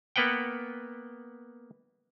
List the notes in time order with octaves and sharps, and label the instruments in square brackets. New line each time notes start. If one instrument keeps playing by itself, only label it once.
[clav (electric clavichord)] A#3 B3 B4 F#5 G5